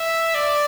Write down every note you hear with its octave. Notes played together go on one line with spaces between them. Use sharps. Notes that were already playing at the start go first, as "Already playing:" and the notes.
Already playing: E5
D5